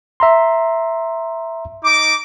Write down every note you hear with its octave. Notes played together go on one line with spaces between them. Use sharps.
E5 A#5 C6
D#4 D6